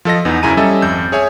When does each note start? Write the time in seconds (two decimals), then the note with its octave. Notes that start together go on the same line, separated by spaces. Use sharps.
0.05 F3 A4 D#5 A#6
0.25 E2 B3 D#4
0.43 F#2 C#3 E4 G#5 A#5 D#7
0.57 G3 C#4 A4 D#5 E5
0.82 G#1 F2 G6
1.12 G#4 C#5 E5 G#5